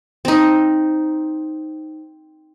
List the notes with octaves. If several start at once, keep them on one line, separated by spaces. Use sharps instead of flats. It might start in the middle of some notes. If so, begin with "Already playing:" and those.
C4 D#4